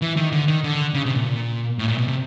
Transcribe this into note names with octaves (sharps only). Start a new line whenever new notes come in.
E3
D#3
D3
D#3
D3
C#3
C3
A#2
A2
A#2
B2
C3